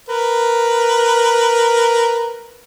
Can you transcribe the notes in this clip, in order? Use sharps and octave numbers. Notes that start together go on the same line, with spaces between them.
A#4 B4